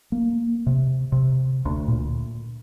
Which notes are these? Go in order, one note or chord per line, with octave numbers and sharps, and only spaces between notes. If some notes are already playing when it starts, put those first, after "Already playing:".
A#3
C3
C3
D2
A#2